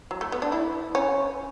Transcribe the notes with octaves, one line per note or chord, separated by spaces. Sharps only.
F#3
A3
B3
D4
E4
C#4